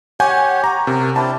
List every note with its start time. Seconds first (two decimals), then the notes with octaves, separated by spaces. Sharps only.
0.20 G4 C#5 F#5 G#5 G6
0.64 A#5
0.87 C3 A#4
1.16 C4 D4 E4 A5